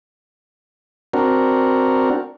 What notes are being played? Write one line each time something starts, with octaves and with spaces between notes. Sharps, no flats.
C4 D4 F#4 A#4